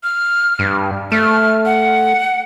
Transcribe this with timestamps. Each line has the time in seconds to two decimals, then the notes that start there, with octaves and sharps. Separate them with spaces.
0.04 F6
0.59 G2
1.12 A3 F6
1.66 F#5